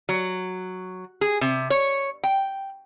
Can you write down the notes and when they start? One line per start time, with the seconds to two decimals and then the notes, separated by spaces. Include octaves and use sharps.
0.09 F#3
1.21 G#4
1.41 C3
1.70 C#5
2.24 G5